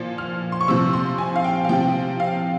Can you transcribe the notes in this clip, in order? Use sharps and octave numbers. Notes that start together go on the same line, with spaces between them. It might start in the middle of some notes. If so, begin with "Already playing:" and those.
Already playing: A#2 F3
F6
C6
C#6
C3 F3 E6
C6
G#5
F5
G5
F5
C3 F3 G5
F5